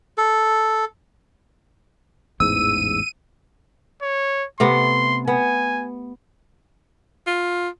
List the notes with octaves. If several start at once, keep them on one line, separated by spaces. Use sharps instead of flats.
A4
A1 E2 G#2 E6 D#7
C#5
C3 A3 B3 C6
B3 G#5
F4